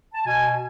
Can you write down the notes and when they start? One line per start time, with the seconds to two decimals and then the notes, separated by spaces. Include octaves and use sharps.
0.14 A5
0.25 B2 G#5